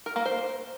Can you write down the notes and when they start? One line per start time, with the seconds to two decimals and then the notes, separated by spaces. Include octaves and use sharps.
0.06 A#4
0.16 A#3
0.25 C5